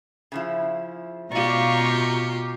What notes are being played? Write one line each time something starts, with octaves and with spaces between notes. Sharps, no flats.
C#3 F3 E4
B2 F4 G4 D5 F5 A#5 C#6
F#2 C3